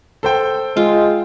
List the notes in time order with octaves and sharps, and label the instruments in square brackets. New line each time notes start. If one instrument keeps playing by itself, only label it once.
[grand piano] A4 C5 G5
[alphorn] G#3 [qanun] F4